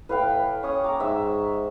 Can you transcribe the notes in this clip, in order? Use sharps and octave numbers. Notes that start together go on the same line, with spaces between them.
A2 B4 F5 G5
C#4 C#5 D#6
A#5 D6
G#2 E5 C#6 E6